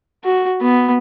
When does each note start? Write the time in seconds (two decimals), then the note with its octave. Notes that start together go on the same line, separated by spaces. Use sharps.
0.24 F#4
0.61 B3